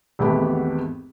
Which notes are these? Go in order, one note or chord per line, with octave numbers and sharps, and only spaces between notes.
G#1 E2 A3 B3 G4 B5